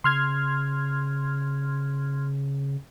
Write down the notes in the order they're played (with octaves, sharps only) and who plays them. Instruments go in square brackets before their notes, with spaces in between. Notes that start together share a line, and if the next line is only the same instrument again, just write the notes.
[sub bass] C#3 [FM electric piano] C6 F6 G#6